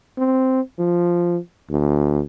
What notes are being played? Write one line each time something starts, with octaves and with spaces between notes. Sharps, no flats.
C4
F3
D2